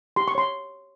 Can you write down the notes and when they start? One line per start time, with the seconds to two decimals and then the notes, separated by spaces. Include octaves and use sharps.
0.16 G4 C6
0.28 C#6
0.35 C#5 C6